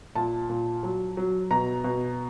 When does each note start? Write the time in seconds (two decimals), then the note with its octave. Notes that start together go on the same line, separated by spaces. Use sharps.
0.15 A#2 A5
0.49 A#2
0.83 F#3
1.17 F#3
1.51 B2 A#5
1.84 B2